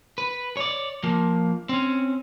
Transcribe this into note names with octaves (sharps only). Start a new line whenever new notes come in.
B4
C#5 D5
F3 A#3
C4 C#4